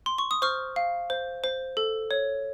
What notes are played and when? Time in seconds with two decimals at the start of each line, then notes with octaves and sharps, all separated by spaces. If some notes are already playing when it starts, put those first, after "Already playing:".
0.06 C6
0.18 C#6
0.31 D#6
0.42 C5 C#6 F6
0.76 F5
1.10 C5
1.44 C5
1.77 A4
2.11 C#5